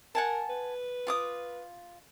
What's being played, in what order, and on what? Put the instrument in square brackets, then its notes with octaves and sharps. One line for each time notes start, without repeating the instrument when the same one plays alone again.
[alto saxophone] A#4 [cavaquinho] F#5 G#5 A5
[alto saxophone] B4
[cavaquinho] F4 D6 D#6